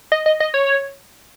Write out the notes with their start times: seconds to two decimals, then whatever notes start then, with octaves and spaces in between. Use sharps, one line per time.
0.12 D#5
0.26 D#5
0.40 D#5
0.54 C#5